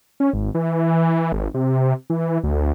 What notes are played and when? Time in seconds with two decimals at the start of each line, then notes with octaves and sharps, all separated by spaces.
0.20 C#4
0.33 G#1
0.55 E3
1.32 G#1
1.54 C3
2.10 E3
2.44 D2